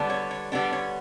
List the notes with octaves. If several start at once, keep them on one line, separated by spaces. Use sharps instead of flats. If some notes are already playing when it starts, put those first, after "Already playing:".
Already playing: D3 G3 B3 D4
C#5
C#5
D3 G3 B3 D4
C#5